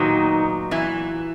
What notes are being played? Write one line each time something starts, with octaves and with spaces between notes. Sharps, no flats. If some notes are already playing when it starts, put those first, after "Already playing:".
Already playing: A#2 D#3 F#3 B3 D#4
E3 E4